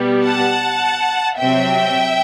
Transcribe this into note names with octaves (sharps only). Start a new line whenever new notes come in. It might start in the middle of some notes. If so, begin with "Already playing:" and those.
Already playing: B2 G3 B3
F#5 A5
C3 F#3 C4 E5 G5